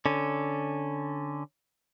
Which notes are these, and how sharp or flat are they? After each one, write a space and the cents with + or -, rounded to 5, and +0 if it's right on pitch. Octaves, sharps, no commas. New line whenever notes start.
D3 +0 C#4 +0